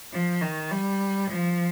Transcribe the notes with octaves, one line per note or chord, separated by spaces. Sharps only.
F3
D#3
G3
F3